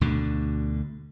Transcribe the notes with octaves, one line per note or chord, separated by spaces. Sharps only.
D2 B2 D3